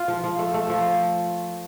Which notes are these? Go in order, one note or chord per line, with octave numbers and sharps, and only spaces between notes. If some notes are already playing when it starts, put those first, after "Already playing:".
Already playing: F4
F3
F3
A3
A3
F3